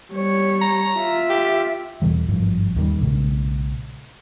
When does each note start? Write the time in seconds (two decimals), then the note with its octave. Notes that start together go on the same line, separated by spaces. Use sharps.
0.14 G3 C#5
0.61 A#5
0.98 F4 E5
1.29 G4
2.02 E2 B2 E3 G3
2.28 G#1 G2 F3
2.76 D#2 D#3 G3
3.01 B1 A#2 C#3 G#3